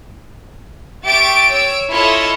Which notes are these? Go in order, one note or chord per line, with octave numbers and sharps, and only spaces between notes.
G4 E5 C#6 A6 D7
C#5 E6 D7
E4 F4 A4 C#5 D#5 E5